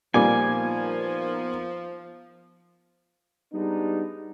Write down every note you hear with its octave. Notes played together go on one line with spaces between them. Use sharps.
A#2 F3 G3 B3 D#4 A#4 G#5 D6
G3 G#3 B3 D4 D#4